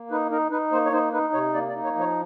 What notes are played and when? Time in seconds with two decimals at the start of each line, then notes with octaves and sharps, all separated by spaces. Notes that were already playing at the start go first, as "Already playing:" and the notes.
Already playing: A#3
0.11 D#4 B4
0.31 D#4 A#4
0.52 D#4 B4
0.72 A#3 C5
0.85 C#5
0.92 D#4 C5
1.13 D#4 B4
1.33 C3 C#5
1.54 A#3 D5
1.69 D5
1.74 D#4
1.84 C#5
1.95 F3 C#5